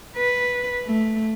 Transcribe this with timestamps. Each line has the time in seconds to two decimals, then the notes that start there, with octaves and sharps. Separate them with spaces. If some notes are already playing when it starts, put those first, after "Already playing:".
0.17 B4
0.86 A3